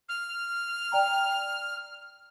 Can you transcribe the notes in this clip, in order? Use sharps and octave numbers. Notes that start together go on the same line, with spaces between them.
F6
D5 G5 A#5